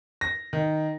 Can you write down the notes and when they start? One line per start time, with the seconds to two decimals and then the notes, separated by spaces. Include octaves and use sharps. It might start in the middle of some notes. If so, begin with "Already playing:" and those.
0.21 A#6
0.53 D#3